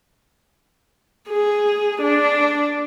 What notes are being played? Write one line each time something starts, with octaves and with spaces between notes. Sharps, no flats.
G#4
D4